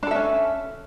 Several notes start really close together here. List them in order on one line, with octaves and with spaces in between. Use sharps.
D4 A4 E5 C#4